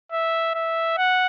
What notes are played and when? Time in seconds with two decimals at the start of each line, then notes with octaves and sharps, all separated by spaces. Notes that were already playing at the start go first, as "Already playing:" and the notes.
0.12 E5
0.55 E5
0.98 F#5